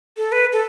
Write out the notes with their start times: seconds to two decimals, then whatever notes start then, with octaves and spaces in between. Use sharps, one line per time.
0.17 A4
0.32 B4
0.52 A4